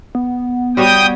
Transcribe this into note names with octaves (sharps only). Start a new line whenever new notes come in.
B3
G3 F#4 C#5 G5 D#6